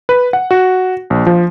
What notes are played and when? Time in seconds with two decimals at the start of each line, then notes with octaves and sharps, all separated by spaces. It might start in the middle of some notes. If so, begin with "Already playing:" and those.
0.09 B4
0.33 F#5
0.51 F#4
1.10 A#1
1.27 F3